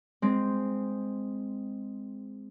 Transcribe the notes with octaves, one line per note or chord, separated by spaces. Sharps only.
G#3 C4